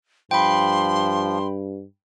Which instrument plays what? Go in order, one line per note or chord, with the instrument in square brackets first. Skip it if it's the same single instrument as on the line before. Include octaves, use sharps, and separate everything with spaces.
[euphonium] G2 [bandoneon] F3 [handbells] G5 B5 [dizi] C6